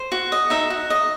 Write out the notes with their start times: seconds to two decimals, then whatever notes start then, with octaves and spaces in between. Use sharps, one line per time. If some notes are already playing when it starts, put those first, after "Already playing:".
Already playing: C5
0.12 F#4
0.32 D#5
0.50 D#4 E5
0.70 F#4
0.90 D#5